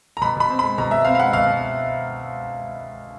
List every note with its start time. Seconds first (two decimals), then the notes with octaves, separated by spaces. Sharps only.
0.17 A#5
0.21 B2 B5
0.37 B2 B5
0.50 C4
0.59 B5
0.63 G#3
0.78 B2 A#5
0.91 B2 E5
1.05 C4 F5
1.15 F5
1.18 G#3 F#5
1.33 B2 F5
1.46 B2